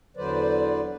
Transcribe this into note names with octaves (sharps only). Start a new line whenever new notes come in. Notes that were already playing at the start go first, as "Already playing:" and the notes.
E2 D3 F#3 B4 C5 D5